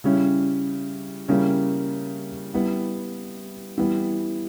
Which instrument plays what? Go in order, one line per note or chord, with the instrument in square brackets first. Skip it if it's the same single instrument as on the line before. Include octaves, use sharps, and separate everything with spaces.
[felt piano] C#3 G3 C#4 E4
C#3 G3 A#3 C#4 E4
G3 B3 E4
E3 G3 B3